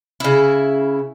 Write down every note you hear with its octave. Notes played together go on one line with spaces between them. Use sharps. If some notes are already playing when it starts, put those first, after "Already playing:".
C#3 E4